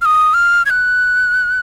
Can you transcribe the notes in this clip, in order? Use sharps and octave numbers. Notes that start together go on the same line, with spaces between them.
F6
D#6
F6
G#6
F#6